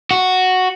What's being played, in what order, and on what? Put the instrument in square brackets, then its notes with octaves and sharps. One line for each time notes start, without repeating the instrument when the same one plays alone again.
[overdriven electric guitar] F#4